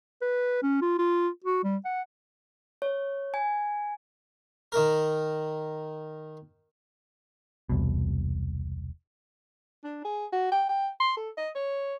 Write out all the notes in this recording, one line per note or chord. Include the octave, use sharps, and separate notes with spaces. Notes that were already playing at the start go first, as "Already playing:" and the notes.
B4
C#4
F4
F4
F#4
G3
F#5
C#5
G#5
D#3 A#4
E1 C2 B2
D4
G#4
F#4
G5
G5
C6
A4
D#5
C#5